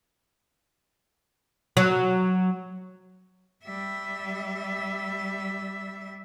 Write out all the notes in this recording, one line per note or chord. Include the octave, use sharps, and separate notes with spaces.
F#3
G3 E5